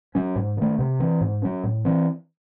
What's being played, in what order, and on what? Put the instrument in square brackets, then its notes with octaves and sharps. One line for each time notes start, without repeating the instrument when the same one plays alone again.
[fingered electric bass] F#3 C#4
G#2
D#3 A3
C3
E3 C4
G#2
F#3 C#4
A2
E3 C4